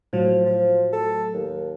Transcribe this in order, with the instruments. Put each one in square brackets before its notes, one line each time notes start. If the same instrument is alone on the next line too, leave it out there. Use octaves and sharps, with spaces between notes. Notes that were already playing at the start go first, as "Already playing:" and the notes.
[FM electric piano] A2 F#3 [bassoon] F3
[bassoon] F3
A4
D#2